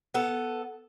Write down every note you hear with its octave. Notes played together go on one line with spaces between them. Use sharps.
B3 A4